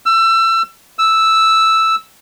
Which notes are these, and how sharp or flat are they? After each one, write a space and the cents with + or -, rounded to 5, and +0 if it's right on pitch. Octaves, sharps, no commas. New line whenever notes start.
E6 +25
E6 -5